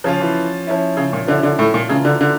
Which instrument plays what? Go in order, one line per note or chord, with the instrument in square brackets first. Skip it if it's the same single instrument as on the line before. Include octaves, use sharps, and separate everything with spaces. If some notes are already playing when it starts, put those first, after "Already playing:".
[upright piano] C#3 [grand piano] F3 C#4 F4
[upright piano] E3
[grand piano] F3 C#4 E4
[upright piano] C#3
A#2
[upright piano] D3 [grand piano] F3 C#4 E4
[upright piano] D3
A2
A#2
[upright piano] C#3 [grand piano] E3 A#3 D4 F4
[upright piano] D3
D3